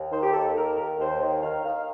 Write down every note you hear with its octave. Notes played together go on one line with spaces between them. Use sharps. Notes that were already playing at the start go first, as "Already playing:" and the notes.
Already playing: D#2
D#3 C5
G4
D#2 A4
D#3 A#4
D#2 A#4
D#2 C5
D#3
D#3 F5
D#3 F5